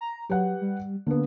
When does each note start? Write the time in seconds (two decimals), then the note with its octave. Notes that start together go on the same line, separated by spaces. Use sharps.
0.01 A#5
0.30 F#3 G4 B4 F#5
0.61 G3
1.07 D3 A#3 B3